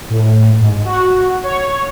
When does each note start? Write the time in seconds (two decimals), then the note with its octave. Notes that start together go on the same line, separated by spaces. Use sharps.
0.10 A2
0.60 G#2
0.85 F#4
1.43 C#5